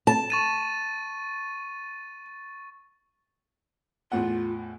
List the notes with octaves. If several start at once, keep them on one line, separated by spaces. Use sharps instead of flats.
A5
C#6 A6 D#7
E2 A2 F4 F#5